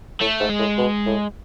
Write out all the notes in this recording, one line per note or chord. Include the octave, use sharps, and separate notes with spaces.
A2 A3
G#2
G#3
A2
B2
A2